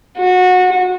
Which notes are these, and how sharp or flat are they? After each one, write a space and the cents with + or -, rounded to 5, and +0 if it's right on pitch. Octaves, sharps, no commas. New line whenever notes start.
F#4 -20